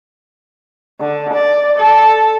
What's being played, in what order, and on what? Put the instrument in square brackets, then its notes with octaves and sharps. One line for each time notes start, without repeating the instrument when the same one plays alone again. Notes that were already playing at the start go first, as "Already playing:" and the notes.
[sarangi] D3
D5
A4